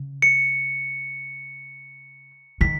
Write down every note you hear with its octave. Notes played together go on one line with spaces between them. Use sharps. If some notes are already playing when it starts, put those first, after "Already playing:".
Already playing: C#3
C#7
D#3 B6